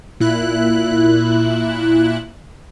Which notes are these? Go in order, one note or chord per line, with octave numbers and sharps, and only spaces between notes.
A#2 E4 F#6